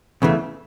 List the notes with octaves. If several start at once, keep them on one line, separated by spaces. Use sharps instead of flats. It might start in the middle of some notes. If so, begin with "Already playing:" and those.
E2 C#3 E3 A3